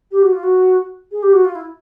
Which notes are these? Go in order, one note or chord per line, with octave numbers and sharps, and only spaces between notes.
G4
F#4
F4
F#4
G#4
G4
F#4
F4
E4